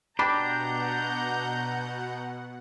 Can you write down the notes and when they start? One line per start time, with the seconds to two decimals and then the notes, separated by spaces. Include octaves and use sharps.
0.19 B2 D4 G4 F#5 A#5 B5 D6 G6